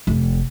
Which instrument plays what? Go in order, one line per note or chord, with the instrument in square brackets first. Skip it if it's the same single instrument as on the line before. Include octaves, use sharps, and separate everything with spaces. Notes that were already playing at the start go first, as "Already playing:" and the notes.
[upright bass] F1